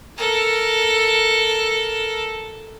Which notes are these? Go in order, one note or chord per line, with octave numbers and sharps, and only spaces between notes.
A4 A#4